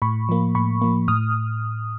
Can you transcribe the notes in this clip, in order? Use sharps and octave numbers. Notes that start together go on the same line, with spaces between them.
A2 B5 C#6
F3 A#3
A2 B5 C#6
F3 A#3
A2 D#6 F6